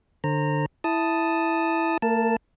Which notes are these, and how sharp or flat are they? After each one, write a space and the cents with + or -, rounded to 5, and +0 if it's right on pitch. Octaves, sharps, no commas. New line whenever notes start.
D3 +20 C5 +25 A#5 -15
E4 +0 A5 +0 D#6 +0
A3 +45 A#4 +0 A5 +5